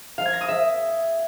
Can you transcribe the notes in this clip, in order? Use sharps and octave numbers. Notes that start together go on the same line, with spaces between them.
F5
G#6
A#6
D#6
E5